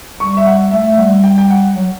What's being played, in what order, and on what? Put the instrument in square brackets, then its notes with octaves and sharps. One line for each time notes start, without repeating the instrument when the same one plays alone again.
[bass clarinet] G3 [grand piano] C#6
[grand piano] E5
F#5
[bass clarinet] A3 [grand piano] E5
[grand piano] E5
[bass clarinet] G3 [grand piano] F#5
[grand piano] G5
G5
F#5
[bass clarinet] F#3